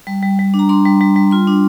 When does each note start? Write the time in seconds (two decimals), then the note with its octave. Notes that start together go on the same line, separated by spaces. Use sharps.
0.07 G3
0.22 G3
0.39 G3
0.54 D4
0.59 A#5
0.69 D4 C6
0.85 G3
1.01 G3
1.16 G3
1.31 F4 C6
1.47 D4